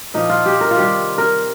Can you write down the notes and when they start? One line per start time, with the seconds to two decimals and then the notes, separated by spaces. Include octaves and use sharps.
0.14 A#2 F3 D#4
0.30 F4
0.46 G4
0.61 A#4
0.71 F4
0.77 C3 D#3 G3 G4
1.18 A#4